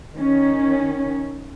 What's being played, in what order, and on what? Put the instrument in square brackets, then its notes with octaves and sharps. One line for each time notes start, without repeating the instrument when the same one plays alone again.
[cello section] D#3 C#4